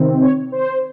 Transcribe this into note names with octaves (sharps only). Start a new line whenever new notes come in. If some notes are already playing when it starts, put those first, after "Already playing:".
Already playing: C3 D#3 C4
C#5
C5